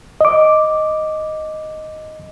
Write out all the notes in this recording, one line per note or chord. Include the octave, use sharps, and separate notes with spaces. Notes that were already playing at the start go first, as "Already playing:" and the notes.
D#5 D6